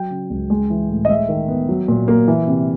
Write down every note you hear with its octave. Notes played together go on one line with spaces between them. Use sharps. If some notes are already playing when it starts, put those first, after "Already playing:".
Already playing: F#3 G5
C#3
C#2
G#3
E3
A2
D#5
G#3 E5
D#3
B3
F#3
A#2
A#3
E3
C3